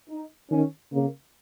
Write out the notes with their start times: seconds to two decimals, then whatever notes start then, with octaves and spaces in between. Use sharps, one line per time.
0.09 D#4
0.51 D#3 C#4
0.93 C#3 A#3